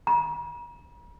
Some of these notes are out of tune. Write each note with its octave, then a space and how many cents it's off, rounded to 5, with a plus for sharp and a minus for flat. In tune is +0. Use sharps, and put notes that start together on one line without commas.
A#5 +45